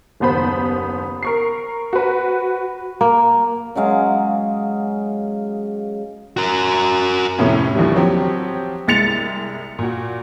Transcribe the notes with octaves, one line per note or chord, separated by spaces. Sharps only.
F#1 D#2 B3 C5 B5
A#4 C#6 C7
F#4 B4
A#3
C#3 F#3 G#3 F5
F#4 A#4
F2 A2 C3 B3 C#4
D#2 D3 E3 F3 G3
F3 F#3 C4 G4
C2 G#3 A6 C#7 F7
A#2 F#4